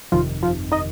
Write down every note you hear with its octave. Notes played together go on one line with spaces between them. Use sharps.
G1 F2 C3 D#3 F3 F4
F3 F4
D#4 D#5